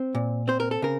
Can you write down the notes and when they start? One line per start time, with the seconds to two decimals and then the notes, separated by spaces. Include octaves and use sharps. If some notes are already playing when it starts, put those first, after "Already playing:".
Already playing: C4
0.15 A#2
0.48 C4 C5
0.60 A#4
0.71 A4
0.82 C#3 A#4